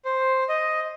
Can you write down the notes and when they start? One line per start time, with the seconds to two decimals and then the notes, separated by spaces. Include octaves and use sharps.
0.05 C5
0.49 D#5